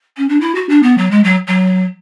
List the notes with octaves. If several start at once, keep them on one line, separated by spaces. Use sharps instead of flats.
C#4
D4
E4
F#4
D4
B3
F#3
G#3
F#3
F#3